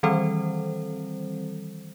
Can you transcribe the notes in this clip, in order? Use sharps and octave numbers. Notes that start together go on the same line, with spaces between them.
D#3 E3 G3 C4 A4 C5